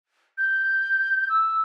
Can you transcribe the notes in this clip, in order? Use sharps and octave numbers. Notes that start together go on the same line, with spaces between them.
G6
E6